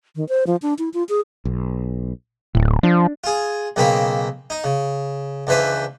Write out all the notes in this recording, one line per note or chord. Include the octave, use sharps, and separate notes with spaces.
D#3
C5
F3
D4
E4
F4
G#4
B1
D1 A2
F3 D4
F4 G#4
B1 C#3 A#3 C4 A#4 B5
D#4
C#3
C#2 D3 E3 B4 C5